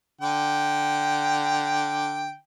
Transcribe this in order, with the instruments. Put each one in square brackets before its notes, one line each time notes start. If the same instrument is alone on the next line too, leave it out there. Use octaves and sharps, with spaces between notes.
[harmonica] D3 G5